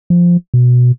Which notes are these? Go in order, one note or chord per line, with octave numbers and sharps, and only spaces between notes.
F3
B2